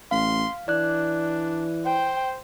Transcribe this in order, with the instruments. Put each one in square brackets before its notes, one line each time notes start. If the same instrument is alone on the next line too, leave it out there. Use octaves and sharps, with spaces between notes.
[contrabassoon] A1 [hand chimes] F5 [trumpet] C6
[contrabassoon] E3 [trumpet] D4 [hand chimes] D5 F#6
[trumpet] C5 [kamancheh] G5